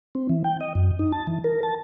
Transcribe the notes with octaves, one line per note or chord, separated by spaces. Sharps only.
C4
E3
G5
D#5
F#2
D#4
A5
E3
A#4
A5